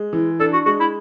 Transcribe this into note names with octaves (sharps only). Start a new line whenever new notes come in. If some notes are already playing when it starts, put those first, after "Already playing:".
Already playing: G#3
E3
D4 A4
F#4
G#3 F#4
E4